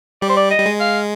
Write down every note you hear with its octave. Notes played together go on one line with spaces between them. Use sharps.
G3 D5
C5
D5
D#5
G3
G#3
F5